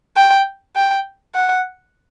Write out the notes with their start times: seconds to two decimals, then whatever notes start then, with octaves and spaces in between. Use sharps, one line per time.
0.16 G5
0.76 G5
1.35 F#5